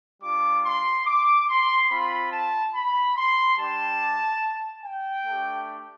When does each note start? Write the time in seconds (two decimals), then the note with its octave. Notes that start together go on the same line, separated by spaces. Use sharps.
0.22 G3 D4 F4 D6
0.65 C6
1.06 D6
1.49 C6
1.90 C4 F4 B5
2.32 A5
2.74 B5
3.17 C6
3.58 G3 D4 G4 A5
4.84 G5
5.26 A3 D4 G4